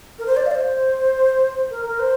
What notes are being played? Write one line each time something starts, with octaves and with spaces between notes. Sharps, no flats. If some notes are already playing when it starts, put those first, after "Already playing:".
A#4
C5
D5
F5
D5
C5
A#4
A#4
C5